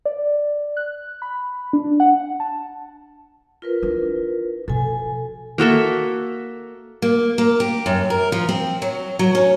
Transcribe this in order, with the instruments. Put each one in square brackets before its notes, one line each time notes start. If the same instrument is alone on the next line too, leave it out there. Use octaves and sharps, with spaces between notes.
[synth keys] D5
F#6
B5
D4
F#5
A5
[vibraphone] F4 A#4 B4
[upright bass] D4 E4
[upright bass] B2 F3 [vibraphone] A4 G#5
[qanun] A#3 F#4 A4 E5
[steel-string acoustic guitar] A#3
A#3
G4
F#2
A#4
F3
C4
F#3
F#3
C#4